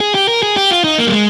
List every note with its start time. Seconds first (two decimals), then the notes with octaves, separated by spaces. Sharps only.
0.01 G#4
0.15 G4
0.28 A#4
0.43 G#4
0.57 G4
0.71 F4
0.84 D#4
0.98 A#3
1.07 G3
1.12 G#3